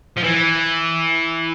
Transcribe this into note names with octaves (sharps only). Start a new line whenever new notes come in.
F3
E3